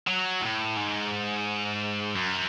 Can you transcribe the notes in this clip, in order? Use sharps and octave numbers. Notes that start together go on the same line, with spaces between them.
F#3
A2
G#2
F#2